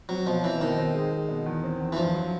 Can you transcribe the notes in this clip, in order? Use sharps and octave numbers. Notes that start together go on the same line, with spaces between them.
F#3 C4
B2 F3
E3 C4
B2 D#3
C4
G#3
G#3
B2
E2
C4
E2
E3
G2 F3
F#3